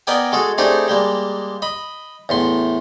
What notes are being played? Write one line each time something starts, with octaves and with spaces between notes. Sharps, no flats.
B3 A#4 D5 D#5 G5 G#5
G#3 F#4 G#4 A4
A3 C4 D4 D#4 G4 G#4
G3 G#3 A#3
D#5 B5
E2 A2 C6